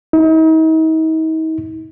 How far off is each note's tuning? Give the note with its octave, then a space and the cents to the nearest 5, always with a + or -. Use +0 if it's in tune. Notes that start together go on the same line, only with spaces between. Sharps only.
D#4 +40